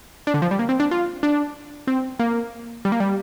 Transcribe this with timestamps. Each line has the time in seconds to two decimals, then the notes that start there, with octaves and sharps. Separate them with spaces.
0.27 D4
0.34 D3
0.42 F3
0.51 G3
0.59 A#3
0.69 C4
0.80 D4
0.91 F4
1.23 D4
1.87 C4
2.20 A#3
2.85 G3
2.92 A#3
3.00 G3